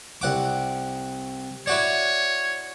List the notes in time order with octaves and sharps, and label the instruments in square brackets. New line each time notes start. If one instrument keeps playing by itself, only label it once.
[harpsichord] C2 F#5 D6
[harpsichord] E4 F#4 D5 [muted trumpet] C#5